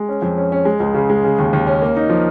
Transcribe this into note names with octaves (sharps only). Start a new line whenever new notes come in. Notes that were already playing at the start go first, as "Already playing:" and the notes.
Already playing: G#3
C#4
F2
C#4
C#4
G#3
C#2
C#3
G#3
C#3
D#2
D#2
C#4
A#3
D#4
F3